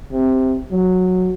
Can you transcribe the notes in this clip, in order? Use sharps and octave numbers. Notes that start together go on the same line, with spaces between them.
C3
F#3